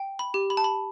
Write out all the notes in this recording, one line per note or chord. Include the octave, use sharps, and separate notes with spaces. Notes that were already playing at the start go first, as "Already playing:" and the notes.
Already playing: G5
B5
G4
B5
A5
B5